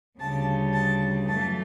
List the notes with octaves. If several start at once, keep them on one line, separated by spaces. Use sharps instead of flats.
D2 C#3 G3 A5
A5
F#2 E3 A3 A5